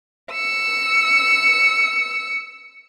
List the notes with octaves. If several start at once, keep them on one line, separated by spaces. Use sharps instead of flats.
E6 C#7